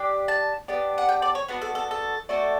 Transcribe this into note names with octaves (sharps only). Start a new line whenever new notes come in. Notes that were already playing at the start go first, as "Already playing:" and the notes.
Already playing: D4 G4
A5
B3 D4 G4
F#5
G5
D5
C#5
B3 D4 F#4 B4
A4
A4
A4
A3 D4 F#4 A4